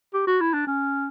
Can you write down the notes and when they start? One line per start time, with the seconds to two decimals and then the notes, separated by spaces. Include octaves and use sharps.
0.14 G4
0.27 F#4
0.41 E4
0.53 D4
0.67 C#4